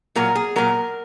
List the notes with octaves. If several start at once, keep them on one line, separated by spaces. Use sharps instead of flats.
A#2 F#3 A#4
G#4
A#2 F#3 A#4